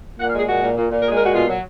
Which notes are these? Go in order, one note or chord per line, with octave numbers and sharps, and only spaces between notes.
A#2 F#5
F5
G#3
G#4
A#2 F#4
A#2
A#2
A#2
A#4
G#3 G#4
A#4
A#2 F#4
B2 F4
F#3